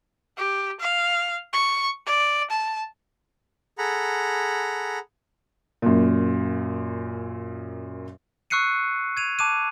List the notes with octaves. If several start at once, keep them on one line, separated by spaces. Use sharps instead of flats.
G4
F5
C#6
D5
A5
G#4 A4 F#5 A#5 B5
F#2 A#2
C#6 E6 F#6 C7 C#7 D#7
G#6 D#7 F7
A5 D6 F#6 D#7